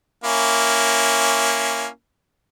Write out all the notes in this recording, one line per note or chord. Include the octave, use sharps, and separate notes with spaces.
A#3 C#4 E4